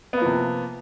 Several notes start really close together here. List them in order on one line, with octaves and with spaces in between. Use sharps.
B3 A#3 F3 C3